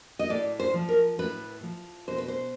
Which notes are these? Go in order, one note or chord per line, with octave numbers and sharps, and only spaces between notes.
D#5
A2 D5
C5
F3
A#4
A2 B4
F3
B2 C5
B4
C5